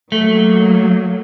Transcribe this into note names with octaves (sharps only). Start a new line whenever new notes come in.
F#3 A3 A#3